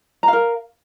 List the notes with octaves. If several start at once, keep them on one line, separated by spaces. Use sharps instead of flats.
A#4 F5 A#5